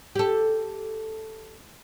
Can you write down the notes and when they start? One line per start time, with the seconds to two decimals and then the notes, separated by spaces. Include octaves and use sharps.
0.15 G4 A4